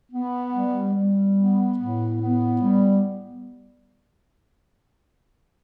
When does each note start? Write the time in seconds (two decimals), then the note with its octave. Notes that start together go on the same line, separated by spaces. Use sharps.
0.11 B3
0.53 G3
0.95 G3
1.37 B3
1.78 A2
2.20 B3
2.62 G3